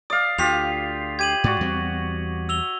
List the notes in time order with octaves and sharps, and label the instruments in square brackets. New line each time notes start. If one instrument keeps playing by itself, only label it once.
[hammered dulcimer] D5 F5 [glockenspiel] D#6
[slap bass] D2 [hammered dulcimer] F4 G4 [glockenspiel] B6 C7 F7
[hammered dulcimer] G4 [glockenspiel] G#6 D#7 F#7
[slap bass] G#2 [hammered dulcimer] F#4 D5
[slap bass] E2 G3 C4
[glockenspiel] E6 F7 G7